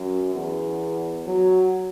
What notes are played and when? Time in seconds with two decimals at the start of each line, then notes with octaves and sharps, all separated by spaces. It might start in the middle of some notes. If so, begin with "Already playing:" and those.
Already playing: F#2
0.35 E2
1.27 F#3